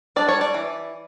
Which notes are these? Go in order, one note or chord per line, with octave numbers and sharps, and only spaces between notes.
G3 D4 D5
C#5
D5
E3